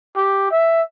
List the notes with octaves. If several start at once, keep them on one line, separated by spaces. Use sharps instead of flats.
G4
E5